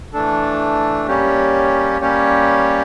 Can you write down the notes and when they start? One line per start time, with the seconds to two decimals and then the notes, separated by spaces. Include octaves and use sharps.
0.13 E3 A3 D4 A4
1.08 G3 A#3 C#4 G4 C#5
2.01 G3 A#3 C#4 G4 C#5